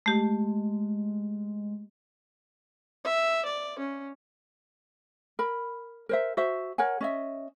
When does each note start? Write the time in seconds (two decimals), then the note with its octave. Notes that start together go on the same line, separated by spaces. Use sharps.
0.06 G#3 A3 G4
3.04 E5
3.45 D5
3.79 C#4
5.39 A#4 B5
6.09 A#4 C5 E5
6.37 F#4 C5 E5
6.78 A#4 C#5 F#5 G#5
7.01 C#4 D#5 E5